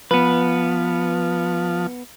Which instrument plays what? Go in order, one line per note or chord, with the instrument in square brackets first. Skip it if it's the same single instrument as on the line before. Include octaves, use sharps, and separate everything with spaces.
[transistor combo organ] F3 [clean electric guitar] B3 B4